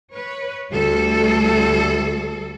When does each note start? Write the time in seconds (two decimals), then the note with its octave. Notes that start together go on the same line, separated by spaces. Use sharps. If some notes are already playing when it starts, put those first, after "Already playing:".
0.13 B4 C#5
0.70 D2 G3 A4